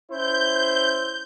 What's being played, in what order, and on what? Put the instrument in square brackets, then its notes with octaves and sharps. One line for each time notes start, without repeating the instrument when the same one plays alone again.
[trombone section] C#4 E4 C5 [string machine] G6